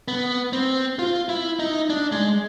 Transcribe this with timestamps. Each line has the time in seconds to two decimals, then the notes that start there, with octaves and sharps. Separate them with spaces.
0.08 B3
0.53 C4
0.99 F4
1.29 E4
1.59 D#4
1.90 D4
2.12 G#3